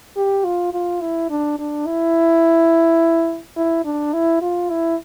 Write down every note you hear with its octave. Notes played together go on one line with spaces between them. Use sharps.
G4
F4
F4
E4
D4
D4
E4
E4
D4
E4
F4
E4